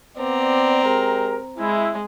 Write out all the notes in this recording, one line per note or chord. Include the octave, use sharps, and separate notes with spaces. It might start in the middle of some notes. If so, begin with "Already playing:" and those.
B3 C4 D5 A#5
G#3 G4 A#4
G#3 E4